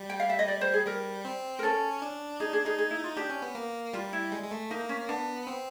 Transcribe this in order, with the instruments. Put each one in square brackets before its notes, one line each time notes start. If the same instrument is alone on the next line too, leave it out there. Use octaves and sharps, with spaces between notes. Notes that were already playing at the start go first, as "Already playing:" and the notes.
Already playing: [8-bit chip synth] G3
[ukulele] G5
F5
E5
D#5
D5
C5
G#4
[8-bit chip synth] G3 [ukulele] A#4
[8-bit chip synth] C4
[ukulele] A#4
[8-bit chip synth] C#4 [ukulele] A4
[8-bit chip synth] D4
[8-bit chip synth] D#4 [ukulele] G#4
[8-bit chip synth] D4 [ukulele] G#4
[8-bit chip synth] D#4 [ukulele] G#4
[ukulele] G#4
E4
F4
[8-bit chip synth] D4 [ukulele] G4
[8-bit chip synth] C#4
B3
A#3
[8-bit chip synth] G3 [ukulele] F4
[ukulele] E4
[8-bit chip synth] G#3
G#3
A3
[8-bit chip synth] A#3 [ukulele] D#4
[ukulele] C#4
[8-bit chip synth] B3 [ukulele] D4
[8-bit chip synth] C4